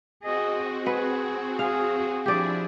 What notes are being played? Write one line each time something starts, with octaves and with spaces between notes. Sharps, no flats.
C4 F#4 G#4 D#5
G#4 B4 F#5
G#4 F5
F3 D4 E4 G4 G#4 D5